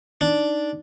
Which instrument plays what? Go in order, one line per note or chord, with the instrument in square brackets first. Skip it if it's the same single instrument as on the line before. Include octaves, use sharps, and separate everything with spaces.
[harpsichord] D4 [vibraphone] D#4 D5